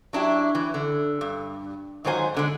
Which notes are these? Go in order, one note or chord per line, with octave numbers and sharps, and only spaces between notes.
F#3 D4 E4 G4
E3
D3
G2
G#2 D#3 F#3 F4 C5 G#5
B2 D3 G#3